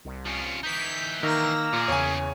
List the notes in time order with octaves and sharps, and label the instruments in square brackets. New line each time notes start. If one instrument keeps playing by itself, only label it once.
[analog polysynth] C2
[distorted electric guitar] F3 C#4
[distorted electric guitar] E3 D#4 [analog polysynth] G6 B6
[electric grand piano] D#3 [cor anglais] A#3 [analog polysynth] A#5 E6 A#6
[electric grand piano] A#2 [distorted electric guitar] B3 G#4
[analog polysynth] E2 C#3 [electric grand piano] C#5 G#5